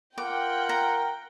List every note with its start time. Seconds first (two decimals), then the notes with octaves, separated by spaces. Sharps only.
0.18 F4 A#4 F#5 G5 D6
0.69 A#5